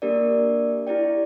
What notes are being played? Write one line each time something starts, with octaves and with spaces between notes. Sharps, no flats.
A#3 D4 G4 A#4 D5
E4 G4 D5 G5